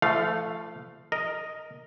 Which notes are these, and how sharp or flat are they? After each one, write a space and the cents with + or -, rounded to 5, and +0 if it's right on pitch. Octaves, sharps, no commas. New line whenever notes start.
F3 -35 A3 +0 F5 +0
A#4 +0 D#5 +0